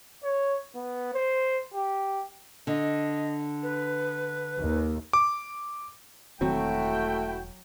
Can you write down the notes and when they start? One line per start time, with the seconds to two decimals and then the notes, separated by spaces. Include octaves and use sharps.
0.23 C#5
0.75 B3
1.14 C5
1.74 G4
2.67 D3 D#5
3.63 B4
4.57 D#2
5.13 D6
6.41 E1 D#3 F#3 A3 C4 E4 F#4 G5